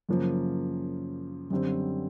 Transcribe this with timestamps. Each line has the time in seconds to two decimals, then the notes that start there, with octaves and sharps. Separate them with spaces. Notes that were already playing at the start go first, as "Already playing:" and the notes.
0.09 F#2 C#3 F3 A#3 C#4
1.50 F#2 D3 G3 C4